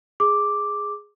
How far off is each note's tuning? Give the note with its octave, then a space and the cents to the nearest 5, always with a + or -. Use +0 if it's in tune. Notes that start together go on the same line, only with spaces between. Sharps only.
G#4 +0 D6 +0